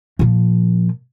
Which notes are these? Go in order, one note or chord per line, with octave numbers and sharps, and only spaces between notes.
A#2 F3